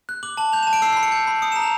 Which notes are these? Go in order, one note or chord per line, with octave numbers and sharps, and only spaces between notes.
F#6
D6 F#7
A5 F#7
G6 F7
E7
A5
D7
E6 C7
C7
B5
C#7
G6
B5
D#6 C#7
E7
A#5
F7